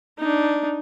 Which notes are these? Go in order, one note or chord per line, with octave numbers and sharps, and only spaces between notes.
D4 D#4